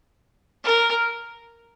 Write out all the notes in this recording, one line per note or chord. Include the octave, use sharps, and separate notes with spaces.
A#4